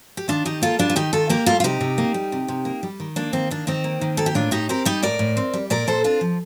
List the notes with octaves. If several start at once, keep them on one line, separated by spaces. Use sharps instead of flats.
G4
D#3 D4 F4
D#3 D#4 G4
A#3 F4 A4
G3 D4 F4
F4
D#3 D#4 G4
D#3 F4 A4
A#3 G4 A#4
G3 F4 A4
F4
C3 D#4 G4
C3
A#3
G3
C3
C3
A#3
G3
D#3
A#3 D4
D#3 C4
A#3 D4
D#3 C4 D#4
A#3
D#3
A#3 A4
G4
A2 D4 F4
A2 D#4 G4
C4 G4 A#4
G3 D#4 G4
A2 A#4 D5
A2
C4
G3
A#2 A#4 D5
A#2 A4 C5
C4 D4 F4
F3